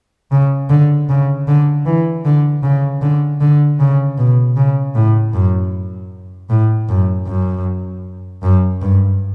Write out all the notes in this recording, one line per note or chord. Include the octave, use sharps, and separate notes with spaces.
C#3
D3
C#3
D3
E3
D3
C#3
D3
D3
C#3
B2
C#3
A2
F#2
A2
F#2
F#2
F#2
G2